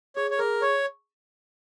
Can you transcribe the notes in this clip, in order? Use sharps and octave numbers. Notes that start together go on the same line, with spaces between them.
G#4 C#5
C#5
G#4 A#4
C#5 C#6